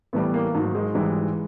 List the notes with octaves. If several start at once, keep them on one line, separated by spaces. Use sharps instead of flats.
A2 E3 G3 B3
A#3
G#2 D#3 F#3
G#3
G#2 E3 G3